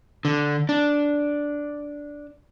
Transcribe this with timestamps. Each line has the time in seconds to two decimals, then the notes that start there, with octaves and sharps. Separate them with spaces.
0.25 D3
0.69 D4